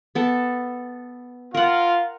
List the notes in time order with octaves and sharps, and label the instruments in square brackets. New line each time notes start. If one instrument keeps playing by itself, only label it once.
[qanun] B3 A4
[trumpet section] F4 [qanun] A#4 F#5